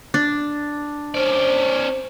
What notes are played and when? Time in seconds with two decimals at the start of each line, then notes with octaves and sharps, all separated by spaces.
0.14 D4
1.15 C#4 C5 D5